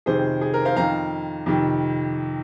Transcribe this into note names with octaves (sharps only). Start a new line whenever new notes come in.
F2 C3 D#3 G#4 C5
G#4
A#4
C5 F5
F2 D#3 F5 A#5
F2 C3 D#3